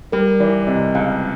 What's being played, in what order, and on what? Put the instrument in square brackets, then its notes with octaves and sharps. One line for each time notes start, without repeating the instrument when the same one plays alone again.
[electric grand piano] G3 [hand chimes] A#4
[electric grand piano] E3 [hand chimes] D5
[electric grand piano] C3 [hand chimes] D#5
[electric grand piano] C#2 [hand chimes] F5